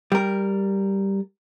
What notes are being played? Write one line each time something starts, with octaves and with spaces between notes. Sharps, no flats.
G3 A#4